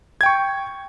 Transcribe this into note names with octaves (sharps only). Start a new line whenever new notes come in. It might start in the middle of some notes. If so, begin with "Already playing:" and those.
G5 C#6 G#6